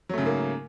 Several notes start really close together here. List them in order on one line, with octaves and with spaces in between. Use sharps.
F#3 A3 C#3 G#2 A#3